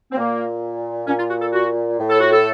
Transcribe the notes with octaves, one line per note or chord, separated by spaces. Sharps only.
C4
A#2 A#3
A#2 C#4
F4
F#4
A4
F#4
A2
A4
F#4
A4